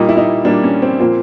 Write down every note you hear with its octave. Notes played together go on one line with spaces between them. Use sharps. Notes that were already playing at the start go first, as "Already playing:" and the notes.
Already playing: A#2 G3 A#3 D#4
E4
D#4
A#2 G3 A#3 D4
C#4
C4
A#2 F3 A#3 C4